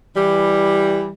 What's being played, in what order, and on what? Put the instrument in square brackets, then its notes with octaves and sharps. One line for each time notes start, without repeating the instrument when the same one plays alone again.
[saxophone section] E3 G3